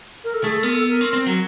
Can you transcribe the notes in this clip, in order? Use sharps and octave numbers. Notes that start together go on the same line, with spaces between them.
A#4
A4
A3 G#4
A4
B3 A#4
A4
A#4
C4
C4
F#3